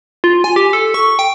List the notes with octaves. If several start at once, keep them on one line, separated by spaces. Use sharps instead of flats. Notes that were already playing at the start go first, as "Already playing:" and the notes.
F4
G#5
G4
A4
C#6
G5